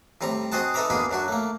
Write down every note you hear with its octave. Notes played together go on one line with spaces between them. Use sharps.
A2 G3 C4 A#5
C4 F#4 G#4 D#5 F#5 A5
D#4 A4 B4 E5 A#5 D6
B2 A#3 D4 G#4 B5
F#2 F#3 D4 F#4
A3 A#3